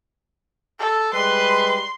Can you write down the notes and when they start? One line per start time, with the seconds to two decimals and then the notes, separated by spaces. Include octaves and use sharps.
0.79 A4
1.14 G3 G#3 B4 C6